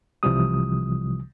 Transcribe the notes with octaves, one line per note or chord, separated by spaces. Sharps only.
C2 C3 E3 F3 G3 D#6